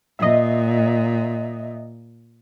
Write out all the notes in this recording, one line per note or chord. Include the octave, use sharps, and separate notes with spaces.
A#2 D#5 E5